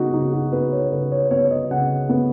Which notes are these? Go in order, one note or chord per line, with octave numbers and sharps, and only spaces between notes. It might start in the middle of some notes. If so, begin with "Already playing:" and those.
Already playing: C#3 B3 D#4 F#4
C#3 D#4
F#4
B3 B4
C#5
C#3 B4
C#5
B3 C#5
D#5
C#3 F#5
B3